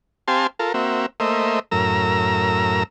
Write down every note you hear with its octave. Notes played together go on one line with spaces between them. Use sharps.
C4 G4 F5 G#5 A5 C6
F4 A4 A#4
A#3 C4 F#4 E5
A3 A#3 C5 D#5 E5
F#2 A2 A#4 A#5 E6